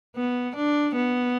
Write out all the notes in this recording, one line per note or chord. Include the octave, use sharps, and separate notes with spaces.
B3
D4
B3